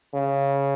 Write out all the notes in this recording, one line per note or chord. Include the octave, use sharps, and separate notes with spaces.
C#3